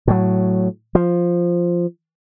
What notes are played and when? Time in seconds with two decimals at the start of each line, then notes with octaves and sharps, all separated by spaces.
0.07 A2 F#3
0.95 F3